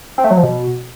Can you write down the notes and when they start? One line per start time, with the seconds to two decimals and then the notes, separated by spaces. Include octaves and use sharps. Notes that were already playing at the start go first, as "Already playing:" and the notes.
0.18 C4
0.24 A3
0.31 F#3
0.37 F3
0.43 B2